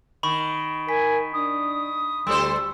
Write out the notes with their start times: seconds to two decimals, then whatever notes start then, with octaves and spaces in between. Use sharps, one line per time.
0.23 D#3 B5 C#6
0.89 A#4 G#5 B6
1.34 D4 D#6
2.27 D2 G3 A4 C5 E6